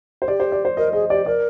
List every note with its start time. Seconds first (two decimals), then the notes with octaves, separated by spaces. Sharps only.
0.22 C5
0.28 G4 D5
0.40 C5
0.52 D5
0.65 C5
0.77 A#4 D#5
0.93 G#4 D#5
1.10 G4 D5
1.26 A#4 D5